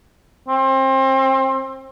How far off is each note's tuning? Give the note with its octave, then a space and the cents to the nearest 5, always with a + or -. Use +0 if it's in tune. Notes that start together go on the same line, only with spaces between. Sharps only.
C4 +30